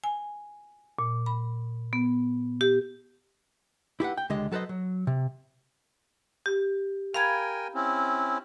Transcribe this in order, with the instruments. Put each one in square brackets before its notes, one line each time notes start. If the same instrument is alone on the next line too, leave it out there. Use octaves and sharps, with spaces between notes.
[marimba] G#5
A#2
B5
B3
G4
[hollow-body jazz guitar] E4 G4 B4 F#5
G5
C#2 D3 G#3 G4 D#5
F#3 A4 B4 C5 D#5
F#3
C3
[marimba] G4
[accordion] A#4 G5 G#5 [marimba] F5 B5 G#6
[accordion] C4 C#4 E4